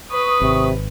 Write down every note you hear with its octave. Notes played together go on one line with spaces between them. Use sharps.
B4 C#6 D#6
G#1 C3